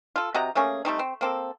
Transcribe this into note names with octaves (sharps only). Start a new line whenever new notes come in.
F4 A4
C3 F#4 D#5 A#5
A3 A#3 C#4 G#4
G3 A3 C4 D#4
C4
A#3 C4 A4